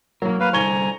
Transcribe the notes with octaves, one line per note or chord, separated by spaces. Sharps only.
F#3 A#3 A#4
A#3 B4 F5
D3 G3 C5 G#5 A#5 C#6 G#6 G7